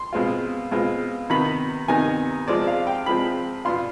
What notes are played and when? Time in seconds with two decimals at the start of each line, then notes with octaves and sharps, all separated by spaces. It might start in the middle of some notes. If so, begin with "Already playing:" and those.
Already playing: C6
0.13 B2 G#3 C4 F4
0.71 B2 G#3 C4 F4
1.30 C3 D#3 B3 D#4 B5
1.88 C3 D#3 B3 D#4 G#5
2.48 C3 F3 G#3 C4 D5
2.67 F5
2.87 G5
3.06 C3 F3 G#3 C4 B5
3.65 B2 B3 D4 F4 C6